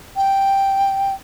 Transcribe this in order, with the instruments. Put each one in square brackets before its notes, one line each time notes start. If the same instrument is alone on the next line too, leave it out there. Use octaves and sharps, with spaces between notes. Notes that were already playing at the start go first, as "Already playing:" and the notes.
[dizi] G5